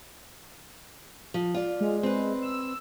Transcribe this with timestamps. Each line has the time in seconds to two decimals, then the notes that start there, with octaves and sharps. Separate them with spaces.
1.34 F3
1.55 F4 D5
1.81 G#3
2.03 C4 B4
2.42 E6